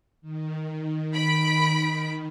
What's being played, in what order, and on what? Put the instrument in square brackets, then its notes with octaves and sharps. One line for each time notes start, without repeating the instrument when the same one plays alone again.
[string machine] D#3
[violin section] B5 B6 D7